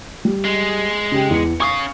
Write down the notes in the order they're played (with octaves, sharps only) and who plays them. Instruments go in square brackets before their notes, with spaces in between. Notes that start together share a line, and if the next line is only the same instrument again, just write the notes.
[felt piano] G3
[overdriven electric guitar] G#3
[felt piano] C#3 G4 G5
E2 C#7
[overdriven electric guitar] C#4 F5 [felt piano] C#6 D#6